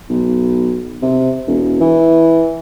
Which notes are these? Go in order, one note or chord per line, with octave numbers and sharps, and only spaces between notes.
B1
C3
E1
E3